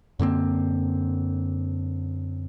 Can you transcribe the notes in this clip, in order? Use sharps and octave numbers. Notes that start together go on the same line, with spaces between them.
F#2 D3 A#3 C4